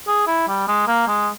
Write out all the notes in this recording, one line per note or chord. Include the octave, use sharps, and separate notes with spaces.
G#4
E4
G3
G#3
A#3
G#3